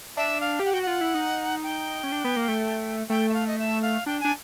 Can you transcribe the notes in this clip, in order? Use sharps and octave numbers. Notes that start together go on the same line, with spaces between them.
D4 E5
F5
G4
F#5
F#4 G5
F#5
F4
E4
D#4
G5
C#4
D4
B3
A#3
A3
A3 G5
E5
F5
D#5
E5
F5
D4 G5
D4 G#5